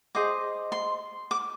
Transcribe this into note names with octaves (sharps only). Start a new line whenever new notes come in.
G#4 C5 D#5 D6
C6
D6